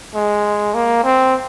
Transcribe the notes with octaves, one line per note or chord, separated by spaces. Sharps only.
G#3
A#3
C4